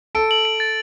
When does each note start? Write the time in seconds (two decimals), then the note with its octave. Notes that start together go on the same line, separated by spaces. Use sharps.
0.15 A4 D7
0.31 F#7
0.45 D7
0.60 A6